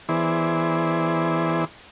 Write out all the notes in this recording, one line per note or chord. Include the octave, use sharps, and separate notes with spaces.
E3 B3 E4 G#4 C5 D5